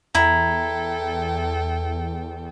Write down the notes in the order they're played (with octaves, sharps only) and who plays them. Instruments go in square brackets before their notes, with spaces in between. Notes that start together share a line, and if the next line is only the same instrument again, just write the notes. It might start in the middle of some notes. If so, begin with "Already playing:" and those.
[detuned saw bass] E2 [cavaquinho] E4 A#5 [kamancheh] A4 G5